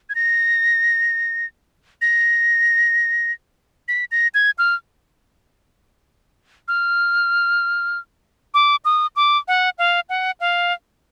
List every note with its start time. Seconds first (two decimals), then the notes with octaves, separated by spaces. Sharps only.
0.09 G#6
0.15 A#6
2.02 A#6
3.88 B6
4.11 A#6
4.34 G#6
4.58 F6
6.68 F6
8.54 D6
8.85 D#6
9.16 D6
9.48 F#5
9.78 F5
10.09 F#5
10.40 F5